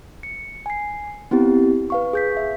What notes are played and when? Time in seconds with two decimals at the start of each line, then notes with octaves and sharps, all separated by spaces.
0.23 C#7
0.66 G#5 C7
1.31 B3 C4 E4 G4
1.90 B4 F5 C#6
2.13 G#4 G6 B6
2.37 E5